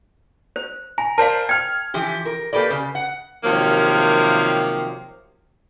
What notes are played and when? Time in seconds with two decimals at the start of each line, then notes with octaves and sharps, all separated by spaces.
0.56 C5
0.98 G#5 A#5
1.18 A#4 C5 D5 F5 A5
1.49 G5 F6 G#6
1.94 E3 F3 G4
2.26 A#4
2.53 A#3 G4 A4 B4 D5
2.70 C#3
2.95 F#5
3.44 C3 D#3 F3 F#3 A#3